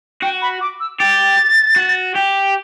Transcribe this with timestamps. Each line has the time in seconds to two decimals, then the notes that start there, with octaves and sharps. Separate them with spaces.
0.22 F#4 G5
0.42 B5
0.61 D6
0.80 E6
0.99 G4 A6
1.76 F#4
2.15 G4